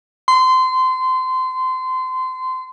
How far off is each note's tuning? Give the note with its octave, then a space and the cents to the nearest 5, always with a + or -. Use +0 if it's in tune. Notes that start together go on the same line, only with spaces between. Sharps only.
C6 -25